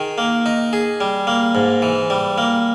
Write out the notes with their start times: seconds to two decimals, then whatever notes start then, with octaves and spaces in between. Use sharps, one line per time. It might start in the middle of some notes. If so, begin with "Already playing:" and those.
Already playing: D#3 G#4
0.18 A#3
0.46 D#4
0.73 G#4
1.01 G3
1.27 A#3
1.55 G#2
1.82 E3
2.10 G3
2.38 A#3